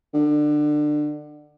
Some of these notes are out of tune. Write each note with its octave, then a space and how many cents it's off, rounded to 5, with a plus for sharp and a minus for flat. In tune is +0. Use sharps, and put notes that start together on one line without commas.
D3 +25